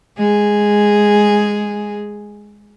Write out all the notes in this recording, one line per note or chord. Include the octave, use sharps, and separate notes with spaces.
G#3 G#4